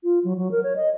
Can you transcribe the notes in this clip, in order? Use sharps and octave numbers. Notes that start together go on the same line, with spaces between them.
F4
F#3
F#3
A#4
C#5
D#5